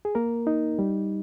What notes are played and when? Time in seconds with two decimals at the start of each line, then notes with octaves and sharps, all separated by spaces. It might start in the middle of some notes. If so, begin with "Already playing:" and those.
0.05 G#4
0.15 A#3 A#4
0.47 D#4
0.79 G3